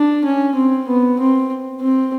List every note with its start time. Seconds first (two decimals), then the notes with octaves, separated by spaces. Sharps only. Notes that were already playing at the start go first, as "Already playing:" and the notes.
Already playing: D4
0.25 C#4
0.56 C4
0.88 B3
1.19 C4
1.81 C4